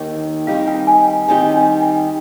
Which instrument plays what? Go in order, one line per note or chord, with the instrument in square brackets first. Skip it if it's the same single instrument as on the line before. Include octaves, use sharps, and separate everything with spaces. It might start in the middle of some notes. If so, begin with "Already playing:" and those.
Already playing: [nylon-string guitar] D#2 D#3 A#3 D#4 G4
[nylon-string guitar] D#3 G3 C4 D#4 G4 [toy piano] F5
[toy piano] G5
G#5
G5
[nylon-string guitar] D#3 G3 C4 D#4 G4 [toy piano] G#5
[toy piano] G#5
G5